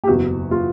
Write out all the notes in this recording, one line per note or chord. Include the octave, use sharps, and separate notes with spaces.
G4
F#1 E2 B2 F#4
F4